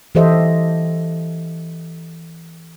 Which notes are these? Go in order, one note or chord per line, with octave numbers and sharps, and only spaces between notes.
E3 G4 A4 C5 D#5 E5